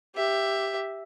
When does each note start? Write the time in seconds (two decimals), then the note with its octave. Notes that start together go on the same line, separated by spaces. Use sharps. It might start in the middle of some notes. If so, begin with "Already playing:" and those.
0.15 G4 E5